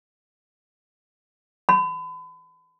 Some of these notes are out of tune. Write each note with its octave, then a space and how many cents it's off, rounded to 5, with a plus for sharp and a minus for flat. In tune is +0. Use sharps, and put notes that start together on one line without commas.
B5 +40